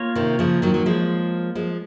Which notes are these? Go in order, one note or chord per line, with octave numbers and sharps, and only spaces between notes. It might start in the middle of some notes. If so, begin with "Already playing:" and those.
Already playing: A#3 F4 A#4 C#5
C3 D#3
C#3 F3
D#3 F#3
F#3
F3 G#3
F3 G#3